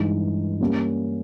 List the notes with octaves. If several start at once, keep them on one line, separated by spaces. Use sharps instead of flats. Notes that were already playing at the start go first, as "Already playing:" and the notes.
Already playing: G2 E3 G#3 D#4
G3 A#3 C#4